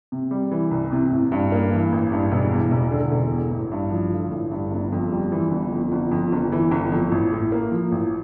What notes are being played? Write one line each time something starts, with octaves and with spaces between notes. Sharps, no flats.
C3
G3
E3
C2
C3
A1
G2
A#3
E3
A1
G2
E1
E2
E1
D3
E1
E2
A1
G2
F3
D3
A1
G2
G1
F2
G3
E3
G1
F2
G1
F2
G1
E3
G1
F2
A1
A2
A#3
F3
A1